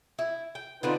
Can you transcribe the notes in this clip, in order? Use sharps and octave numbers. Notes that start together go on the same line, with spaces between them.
E4
G5
D3 C4 D4 D#4 F4 B4